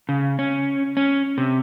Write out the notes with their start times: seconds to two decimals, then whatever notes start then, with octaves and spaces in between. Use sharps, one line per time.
0.09 C#3
0.39 C#4
0.97 C#4
1.38 C3